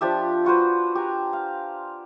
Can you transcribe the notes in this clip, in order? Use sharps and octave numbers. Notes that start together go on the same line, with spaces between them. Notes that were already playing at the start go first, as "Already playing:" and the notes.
F3 D4 G4 E5
F4 F#4 B4 C5
G4 G#5 A#5
F5